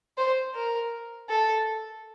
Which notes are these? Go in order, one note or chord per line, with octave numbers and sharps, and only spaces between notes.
C5
A#4
A4